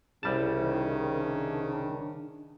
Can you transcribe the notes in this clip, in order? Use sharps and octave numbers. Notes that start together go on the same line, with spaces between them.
C2 C#3 G3 E4 A5
D#3
D4